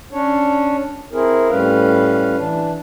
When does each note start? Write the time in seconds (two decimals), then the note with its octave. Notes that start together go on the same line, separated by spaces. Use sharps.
0.12 C#4 D4 C#5
1.13 C4 E4 G#4 A#4
1.50 A2 G3 C#4 B4 F5
2.38 E3 D4